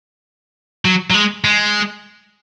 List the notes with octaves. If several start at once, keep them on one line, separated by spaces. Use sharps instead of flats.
F#3
F#3
G#3
G#3